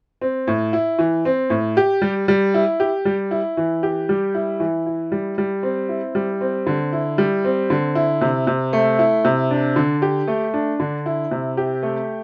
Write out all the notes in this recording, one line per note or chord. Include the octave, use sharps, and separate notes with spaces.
C4
A2
E4
E3
C4
A2
G4
G3
G3
E4
G4
G3
E4
E3
G4
G3
E4
E3
E4
G3
G3
C4
E4
G3
C4
D3
E4
G3
C4
D3
E4
C3
C3
A3
E4
C3
D4
D3
G4
A3
D4
D3
E4
C3
G4
A3